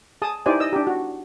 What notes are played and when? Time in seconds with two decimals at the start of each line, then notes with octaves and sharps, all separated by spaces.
0.22 G#4 A5 D#6
0.46 D#4 E4 G4 C5 D5 G#5
0.60 D#5 E6
0.73 D4 G4
0.87 F#4